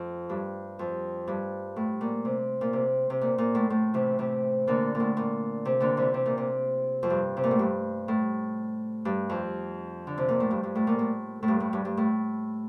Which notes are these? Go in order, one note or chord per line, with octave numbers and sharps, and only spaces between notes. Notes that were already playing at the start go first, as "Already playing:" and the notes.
Already playing: F2
G2
F2
G2
A2
A#2
C3
A#2
C3
C3
A#2
A#2
A2
A2
C3 E3
C3 E3
A#2 D3
A#2
A2
A#2
C3
A#2 D3
C3 E3
C3
A#2
C3
F2
G2
C3
A#2
A2
G2
A2
G2
F2
D3
C3
A#2
A2
G2
G2
A2
A#2
A2
A2
G2
A2
G2
G2
A2